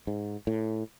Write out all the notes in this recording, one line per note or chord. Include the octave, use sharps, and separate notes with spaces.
G#2
A2